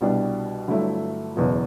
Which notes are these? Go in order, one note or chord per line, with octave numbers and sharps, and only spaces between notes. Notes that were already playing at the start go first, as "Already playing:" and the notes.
C2 B2 G3 D4
G1 G2 F#3 A3 E4
F#1 E2 B2 F#3